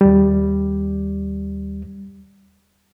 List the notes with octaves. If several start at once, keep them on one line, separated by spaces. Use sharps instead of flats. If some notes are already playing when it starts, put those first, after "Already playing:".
D#2 G3